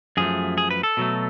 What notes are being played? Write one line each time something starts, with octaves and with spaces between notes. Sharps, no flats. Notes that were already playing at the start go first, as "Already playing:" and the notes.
F#2 F3 A3 G#4
G#4
B4
A4
B2 F#3 A3